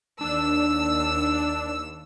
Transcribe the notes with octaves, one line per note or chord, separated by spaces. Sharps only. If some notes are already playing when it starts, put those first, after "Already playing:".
D#2 D4 E6